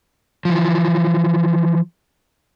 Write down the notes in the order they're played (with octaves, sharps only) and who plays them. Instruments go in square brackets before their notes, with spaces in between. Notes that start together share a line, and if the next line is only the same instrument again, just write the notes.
[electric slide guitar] E3 F3